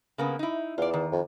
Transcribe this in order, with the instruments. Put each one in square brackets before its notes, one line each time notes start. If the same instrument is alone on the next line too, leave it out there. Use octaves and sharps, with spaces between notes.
[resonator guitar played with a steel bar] C#3 A#3 B3
D#4 E4
[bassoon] E2 [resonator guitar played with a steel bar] F4 D5
[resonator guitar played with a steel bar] D#3
[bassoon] F2